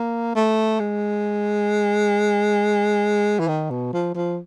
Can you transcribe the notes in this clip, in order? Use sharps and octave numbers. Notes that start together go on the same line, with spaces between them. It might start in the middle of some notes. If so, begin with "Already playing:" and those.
Already playing: A#3
A3
G#3
E3
D#3
B2
F3
F3